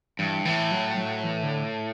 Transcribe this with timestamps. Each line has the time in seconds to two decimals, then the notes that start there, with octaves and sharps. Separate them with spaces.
0.19 G2 E3
0.45 A2 E3
0.72 F#3
0.98 F#3
1.24 E3
1.43 D3